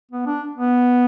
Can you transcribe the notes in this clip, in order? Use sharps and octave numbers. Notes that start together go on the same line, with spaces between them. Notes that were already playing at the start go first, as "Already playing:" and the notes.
B3
D4
B3